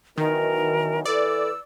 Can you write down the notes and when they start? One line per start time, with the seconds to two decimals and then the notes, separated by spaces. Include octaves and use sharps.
0.18 B2 D#3 E3 F#3 A#4
1.05 E3 A4 B4 D5 E6